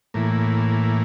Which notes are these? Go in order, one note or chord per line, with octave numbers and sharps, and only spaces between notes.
A2 E3 A#3